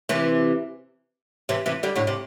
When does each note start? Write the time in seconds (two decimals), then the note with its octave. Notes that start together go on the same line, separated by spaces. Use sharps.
0.09 C3 E3
1.49 C3 E3
1.66 C3 E3
1.83 D3 G3
1.96 A2 D3
2.07 C3